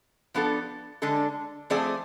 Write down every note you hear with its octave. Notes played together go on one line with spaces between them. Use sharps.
F3 B3 D4 A4
D3 G#3 D4 A4
F3 A3 C4 G#4 D5